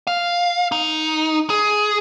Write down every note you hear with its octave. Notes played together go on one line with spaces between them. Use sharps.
F5
D#4
G#4